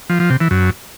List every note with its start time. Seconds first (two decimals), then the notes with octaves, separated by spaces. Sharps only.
0.10 F3
0.20 F3
0.30 C3
0.40 E3
0.51 F#2